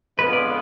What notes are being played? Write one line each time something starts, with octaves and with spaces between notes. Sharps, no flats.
F2 D3 G#3 B3 F4 B4
D5